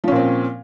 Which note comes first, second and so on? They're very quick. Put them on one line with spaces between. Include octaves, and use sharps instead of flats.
F3 C#4 A#2 C4